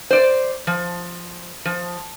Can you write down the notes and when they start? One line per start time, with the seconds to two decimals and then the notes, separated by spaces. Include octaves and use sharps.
0.11 C5 D5
0.67 F3
1.65 F3